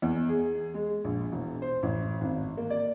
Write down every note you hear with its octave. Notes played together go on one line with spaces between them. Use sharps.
E2
G#4
G#3
A#1
E1
C5
A1
G#1
A#3
D5